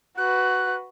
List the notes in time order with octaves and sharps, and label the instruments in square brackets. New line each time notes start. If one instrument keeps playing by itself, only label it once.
[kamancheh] F#4 B4 [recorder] F#6